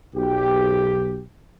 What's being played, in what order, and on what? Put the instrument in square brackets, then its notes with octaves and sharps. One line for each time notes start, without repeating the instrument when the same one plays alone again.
[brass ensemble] B1 G4